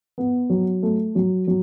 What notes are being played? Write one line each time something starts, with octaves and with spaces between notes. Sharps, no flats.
B3
F#3
A3
F#3
F#3